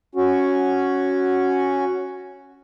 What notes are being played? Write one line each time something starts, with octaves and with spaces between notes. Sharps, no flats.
C#4 F#4